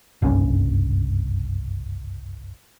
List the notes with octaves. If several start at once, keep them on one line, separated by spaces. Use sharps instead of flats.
F#1 C2 G2 C#4